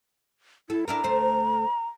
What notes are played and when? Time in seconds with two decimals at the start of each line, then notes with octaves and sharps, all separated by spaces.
0.70 E4 A4
0.88 D4 E4 A#4 A#5
1.03 D2 A3 C5